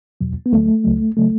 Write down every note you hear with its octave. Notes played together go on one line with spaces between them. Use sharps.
E2 B2 F#3
B3
D2 D3 F#3 A3
C#2 C#3 F#3
C#3 F#3 A3